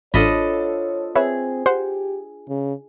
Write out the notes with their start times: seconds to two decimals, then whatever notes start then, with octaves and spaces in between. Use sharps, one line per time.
0.14 A1 D4 F4 A4 C5 C#5 D#5 B5
1.15 C4 G#4 B4 C#5 E5
1.66 G4 C5 F#5
2.48 C#3